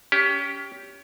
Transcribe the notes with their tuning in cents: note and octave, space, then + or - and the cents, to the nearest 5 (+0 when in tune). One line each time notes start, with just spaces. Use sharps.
C#4 +25 G4 +0